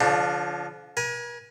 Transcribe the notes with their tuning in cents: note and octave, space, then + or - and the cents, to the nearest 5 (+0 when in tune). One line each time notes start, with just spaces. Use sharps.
D3 -45 F3 +0 D4 +15
A#4 +45 G#5 +0